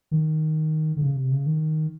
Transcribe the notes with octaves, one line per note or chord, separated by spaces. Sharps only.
D#3
D3
C#3
C3
C#3
D#3